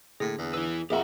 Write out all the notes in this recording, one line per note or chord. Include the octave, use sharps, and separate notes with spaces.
A2 D3 A#3 G#4 A#6
E2
E4 B4 E6
F2 G4 G#4 E5 F#5 A#5